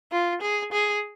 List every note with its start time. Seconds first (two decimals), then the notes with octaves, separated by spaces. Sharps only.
0.12 F4
0.42 G#4
0.72 G#4